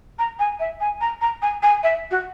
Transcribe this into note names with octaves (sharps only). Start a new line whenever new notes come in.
A#5
G#5
E5
G#5
A#5
A#5
G#5
G#5
E5
F#4